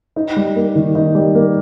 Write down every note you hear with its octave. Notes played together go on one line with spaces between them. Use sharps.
D#4
G3
A#3
D#3
D#4
G3
A#3